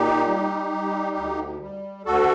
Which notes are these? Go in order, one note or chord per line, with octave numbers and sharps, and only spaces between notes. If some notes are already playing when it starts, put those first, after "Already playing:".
Already playing: A#2 D#4 G4
G3
G3
D2
G3
D2 F#4 A4